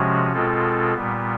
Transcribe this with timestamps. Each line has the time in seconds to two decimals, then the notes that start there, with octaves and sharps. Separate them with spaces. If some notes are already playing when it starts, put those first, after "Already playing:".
Already playing: C3 F3 G#3 C#4 F#4
0.33 B2 G#3 C4 F4 A4
0.94 A#2 G3 B3